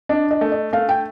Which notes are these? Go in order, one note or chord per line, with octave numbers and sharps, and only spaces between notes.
D4 D#5
D#5
A3
D#5
A3 F5
G5